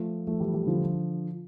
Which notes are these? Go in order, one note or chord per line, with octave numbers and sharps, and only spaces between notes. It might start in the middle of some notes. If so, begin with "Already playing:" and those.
Already playing: F3 A3
F3 A3
E3 G3
E3 G3
D3 F3